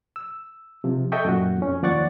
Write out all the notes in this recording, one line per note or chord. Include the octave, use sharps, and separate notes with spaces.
E6
C3 F3
A4 D#5 E5 G5 C#6
F#2 A#2 F#4
F2 C#4
D#2 F3 D5 F#5 C#6 A6